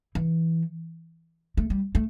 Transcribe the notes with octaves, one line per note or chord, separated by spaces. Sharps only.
E3
A3
G3
A3